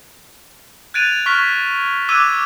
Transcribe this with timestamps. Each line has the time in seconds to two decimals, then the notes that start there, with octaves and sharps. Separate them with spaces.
0.94 F#6 G#6 A6 D7 D#7 F7
1.26 C#6 F6 F#6 B6 D7 G7
2.09 D6 E6 F#6 G#6 D#7 E7